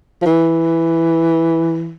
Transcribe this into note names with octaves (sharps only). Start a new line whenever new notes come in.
F3
E3